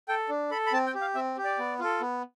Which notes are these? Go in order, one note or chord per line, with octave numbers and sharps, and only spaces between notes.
A4 G5
D4
A4 B5
B5
C4 A5
G5
G4
F5
C4 E5
G4
D5
B3
F4 A4
B3